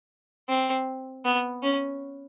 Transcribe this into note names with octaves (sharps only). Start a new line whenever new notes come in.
C4
B3
C#4